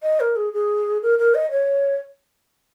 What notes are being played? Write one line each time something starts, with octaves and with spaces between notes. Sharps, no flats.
D#5
A#4
G#4
G#4
A#4
A#4
D#5
C#5